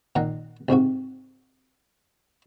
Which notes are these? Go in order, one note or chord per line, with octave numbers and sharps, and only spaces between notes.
A#2 D#3 F#5 A#5
C2 G#2 C3 F#4